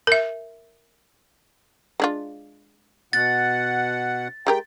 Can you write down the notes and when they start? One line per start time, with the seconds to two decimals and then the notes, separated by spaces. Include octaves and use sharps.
0.07 A#4 E5
2.00 G#3 D4 F4
3.13 B2 F#5 A6
4.47 G#3 G4 A#4 G5